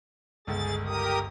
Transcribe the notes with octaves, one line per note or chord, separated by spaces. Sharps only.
G1 C#2 G#4 A6
G4 A#4 D#6